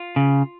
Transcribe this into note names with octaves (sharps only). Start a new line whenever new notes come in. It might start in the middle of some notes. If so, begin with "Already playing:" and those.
Already playing: F4
C#3